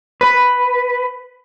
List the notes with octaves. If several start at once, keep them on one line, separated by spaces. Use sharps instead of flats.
B4